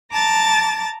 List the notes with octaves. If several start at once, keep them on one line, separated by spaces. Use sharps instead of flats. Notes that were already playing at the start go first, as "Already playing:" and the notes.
A5 A#5 D6 A6